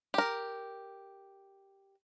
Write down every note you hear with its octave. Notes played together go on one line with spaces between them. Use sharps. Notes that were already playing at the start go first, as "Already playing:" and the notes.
G4 A#4